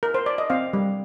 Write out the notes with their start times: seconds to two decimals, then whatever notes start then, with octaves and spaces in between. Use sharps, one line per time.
0.03 A#4
0.14 C5
0.26 D5
0.38 D#5
0.50 C4 F5
0.73 G3